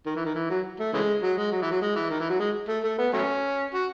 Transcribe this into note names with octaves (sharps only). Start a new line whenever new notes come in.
D#3
E3
D#3
E3
F#3
A3
C#3 E3 G#3
F#3
G#3
F#3
E3
F#3
G#3
E3
D#3
E3
F#3
G#3
A3
A3
B3
F#3 A3 C#4
F#4